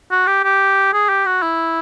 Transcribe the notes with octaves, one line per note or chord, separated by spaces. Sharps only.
F#4
G4
G4
G#4
G4
F#4
E4